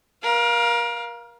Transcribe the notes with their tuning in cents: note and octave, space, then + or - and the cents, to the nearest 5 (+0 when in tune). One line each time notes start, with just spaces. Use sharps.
A#4 +30 F5 +0